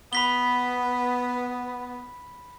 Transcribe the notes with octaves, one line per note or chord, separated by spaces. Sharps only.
B3 B5 B6 G7